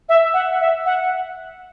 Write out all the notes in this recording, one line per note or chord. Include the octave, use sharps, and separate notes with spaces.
E5
F#5
E5
F#5